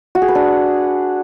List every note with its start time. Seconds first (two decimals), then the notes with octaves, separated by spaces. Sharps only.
0.15 F#4
0.22 G#4
0.28 B4
0.35 D4